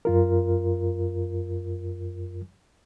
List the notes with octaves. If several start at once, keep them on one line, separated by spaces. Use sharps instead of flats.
F#2 F4 A#4